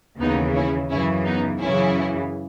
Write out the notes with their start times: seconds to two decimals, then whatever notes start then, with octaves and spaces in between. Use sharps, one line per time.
0.19 D#2 C#3 E3 B3 D#4
0.55 C#4 E4
0.90 F#2 C#3 E3 C#4 E4
1.25 B3 D#4
1.60 F#2 C#3 E3 C#4 E4